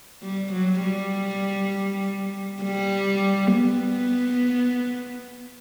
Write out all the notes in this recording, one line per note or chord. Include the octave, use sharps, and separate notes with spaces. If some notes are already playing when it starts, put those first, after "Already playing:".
G3
F#3
G3
G3
B3